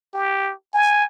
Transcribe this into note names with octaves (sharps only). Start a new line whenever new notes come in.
G4
G#5